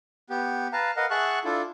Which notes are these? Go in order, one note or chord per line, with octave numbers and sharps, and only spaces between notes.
B3 G4
B4 F5 A5 A#5
A#4 B4 D#5 F5 F#5
G#4 E5 F#5 A5 C#6 F#6
D4 E4 F4 A4